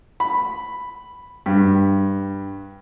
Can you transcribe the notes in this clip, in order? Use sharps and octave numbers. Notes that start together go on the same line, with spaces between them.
B5
G2